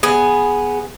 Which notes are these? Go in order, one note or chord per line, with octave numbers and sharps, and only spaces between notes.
B3 G#4